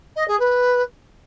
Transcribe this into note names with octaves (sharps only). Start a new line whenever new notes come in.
D#5
G#4
B4